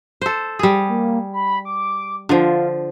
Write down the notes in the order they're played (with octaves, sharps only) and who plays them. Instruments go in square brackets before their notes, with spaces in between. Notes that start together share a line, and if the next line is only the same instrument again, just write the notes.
[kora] A4 C5
G3 G#4
[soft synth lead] A#3
B5
D6
[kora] D3 F3 [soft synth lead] F4